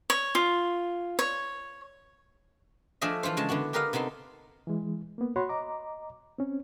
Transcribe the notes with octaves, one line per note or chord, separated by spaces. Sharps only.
C#5
F4
C#5
F3 A3 D4 G#4 D#5 E5
E3 F4 A4 C5
C#3 G#3 A5
D3 B3 E4 F#4
G4 A#4 B4 D#5 F5
C3 B3 D#4 A4 C6
E3 G#3
A#3 B3
F#4 C#5 F#5 B5 C6
D#5 A#5 D6
C4 C#4